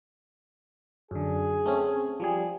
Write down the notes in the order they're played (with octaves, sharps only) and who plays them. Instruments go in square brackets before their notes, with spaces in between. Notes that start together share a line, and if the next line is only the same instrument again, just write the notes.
[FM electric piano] F#2 D3 [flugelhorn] G#4
[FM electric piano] A3 C4 C#4
F3 G3 G#4